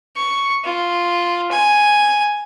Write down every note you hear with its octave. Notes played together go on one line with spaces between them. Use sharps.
C#6
F4
G#5